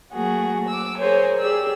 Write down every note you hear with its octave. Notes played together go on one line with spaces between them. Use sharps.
F#3 A3 A#3 F#4 G#4
D6 E6
G#4 A#4 C5 C#5 G#5
G4 G#4 D5 E6